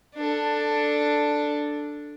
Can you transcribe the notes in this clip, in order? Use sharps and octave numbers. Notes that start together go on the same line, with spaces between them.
D4 A4